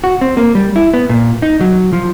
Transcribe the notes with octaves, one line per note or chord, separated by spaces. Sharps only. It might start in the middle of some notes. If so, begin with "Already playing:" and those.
F#4
C4
A#3
G3
E4
B3
A#2
D#4
F#3
F3